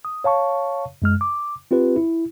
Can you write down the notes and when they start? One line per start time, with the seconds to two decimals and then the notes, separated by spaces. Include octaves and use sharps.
0.05 D#6
0.24 C#5 F5 A5 C#6
1.02 F#2 G#3 F6
1.21 D6
1.71 C4 F4 G4 B4
1.96 E4